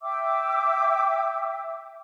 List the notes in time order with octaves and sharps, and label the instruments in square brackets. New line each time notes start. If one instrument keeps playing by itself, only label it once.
[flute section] E5 G5 D6 E6